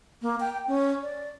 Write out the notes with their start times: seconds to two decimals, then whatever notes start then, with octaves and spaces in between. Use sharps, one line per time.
0.22 A#3
0.40 G5
0.68 C#4
1.02 D5